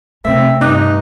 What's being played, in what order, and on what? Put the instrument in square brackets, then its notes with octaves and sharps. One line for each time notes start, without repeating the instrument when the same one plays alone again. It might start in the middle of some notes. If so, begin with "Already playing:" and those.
[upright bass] C3 C#4 [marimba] A3 [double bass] C4 [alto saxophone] E5
[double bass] G2 [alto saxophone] D#4 [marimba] D6 F#6